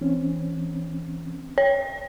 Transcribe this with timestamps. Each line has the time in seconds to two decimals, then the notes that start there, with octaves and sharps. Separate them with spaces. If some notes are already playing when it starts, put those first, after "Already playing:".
0.01 E3 C4 C#4
1.58 C#5